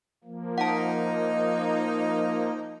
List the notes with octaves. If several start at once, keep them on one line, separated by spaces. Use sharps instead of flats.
F3 A#3
D#4 F#5 A5